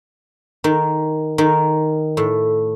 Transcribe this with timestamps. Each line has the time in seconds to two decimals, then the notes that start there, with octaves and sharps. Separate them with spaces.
0.64 D#3
1.38 D#3
2.17 A2